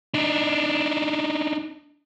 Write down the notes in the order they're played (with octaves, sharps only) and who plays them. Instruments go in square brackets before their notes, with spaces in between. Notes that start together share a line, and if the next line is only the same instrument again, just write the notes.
[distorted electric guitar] D4 D#4